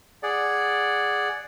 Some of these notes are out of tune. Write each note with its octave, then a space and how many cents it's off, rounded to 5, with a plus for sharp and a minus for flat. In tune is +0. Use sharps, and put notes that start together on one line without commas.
G#4 +0 D5 +0 F#5 +0